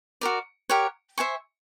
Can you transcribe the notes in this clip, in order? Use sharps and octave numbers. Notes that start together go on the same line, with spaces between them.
F#4 A#4 D5
G4 A#4 C#5 F#5
C5 E5 G#5 C#6